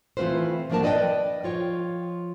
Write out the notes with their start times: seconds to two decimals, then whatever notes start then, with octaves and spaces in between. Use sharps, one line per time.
0.17 E3 A3 C4 F4 B4 C5
0.70 F3 F#3 A#3 D4 A#4 A5
0.83 B4 D5 D#5 F#5 G5
1.43 F3 F4 C#5 G5